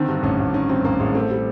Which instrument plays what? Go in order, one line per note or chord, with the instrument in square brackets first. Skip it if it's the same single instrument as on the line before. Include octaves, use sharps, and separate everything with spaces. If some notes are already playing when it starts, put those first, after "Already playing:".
Already playing: [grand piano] D3 D#3 [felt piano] C4
[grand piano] G2
[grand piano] A1 [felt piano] C#4
[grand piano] A1
[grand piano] D#3 [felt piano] C#4
[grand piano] G2 [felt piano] C4
[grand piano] A1 [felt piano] A#3
[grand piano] A1 [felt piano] G#3
[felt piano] A3 [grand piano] C4
[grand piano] G3